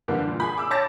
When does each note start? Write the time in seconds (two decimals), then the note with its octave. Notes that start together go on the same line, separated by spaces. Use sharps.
0.08 D3 E3 G3 A#3
0.28 A#2
0.40 G#4 G#5 B5
0.58 D6 E6
0.70 C#5 A5 D6 A6 A#6